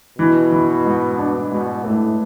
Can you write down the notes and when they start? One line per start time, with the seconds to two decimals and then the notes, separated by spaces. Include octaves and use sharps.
0.19 B2 E3
0.52 E3
0.85 G#2
1.18 D4
1.51 G#2 B2
1.84 A2 A3